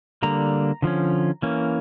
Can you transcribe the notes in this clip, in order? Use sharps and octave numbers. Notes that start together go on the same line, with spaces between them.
D3 G3 A#3 A#5
D3 F3 C#4
E3 A#3 C#4